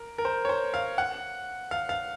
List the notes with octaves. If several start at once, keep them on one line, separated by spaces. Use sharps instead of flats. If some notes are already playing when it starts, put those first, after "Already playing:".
Already playing: A#4
A#4
C5
C#5
C5
F5
F#5
F5
F5